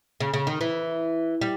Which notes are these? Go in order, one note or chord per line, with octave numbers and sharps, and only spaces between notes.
C#3
C#3
D#3
E3
G3